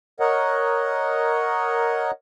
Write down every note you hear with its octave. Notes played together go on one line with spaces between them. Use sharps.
A#4 C#5 D#5 F#5